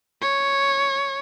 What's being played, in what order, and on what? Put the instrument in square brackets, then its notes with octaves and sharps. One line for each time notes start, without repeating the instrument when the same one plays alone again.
[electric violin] C#5